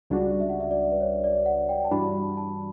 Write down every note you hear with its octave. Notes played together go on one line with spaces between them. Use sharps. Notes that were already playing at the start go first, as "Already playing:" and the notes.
C#2 C#3 G3 D4 F#4 D5
E5
F#5
E5
D5
B4
C#5
D5
F#5
G5
A5
G2 E3 G3 D4 F#4 B5
A5